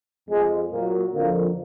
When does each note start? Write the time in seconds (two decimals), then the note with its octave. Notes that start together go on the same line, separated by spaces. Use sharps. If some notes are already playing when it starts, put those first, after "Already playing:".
0.29 F2 F3 G#3
0.71 A#2 F#3 A#3
1.13 F2 D3 F3 A#3